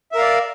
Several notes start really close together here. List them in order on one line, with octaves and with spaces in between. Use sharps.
E5 A#4 F5 D5